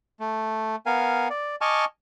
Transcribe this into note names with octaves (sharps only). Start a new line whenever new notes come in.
A3
B3 A#4 F5 G#5
D5
D#5 G#5 A5 C#6 D6 F6